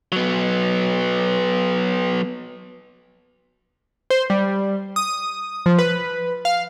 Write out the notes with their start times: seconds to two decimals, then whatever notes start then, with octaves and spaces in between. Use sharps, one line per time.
0.12 F#3 B3
4.10 C5
4.30 G3
4.96 D#6
5.66 F3
5.79 B4
6.45 F5